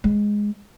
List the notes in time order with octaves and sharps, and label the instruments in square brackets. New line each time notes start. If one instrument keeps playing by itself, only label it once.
[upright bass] G#3